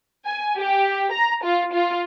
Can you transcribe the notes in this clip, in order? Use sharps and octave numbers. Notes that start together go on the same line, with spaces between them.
G#5
G4
A#5
F4
F4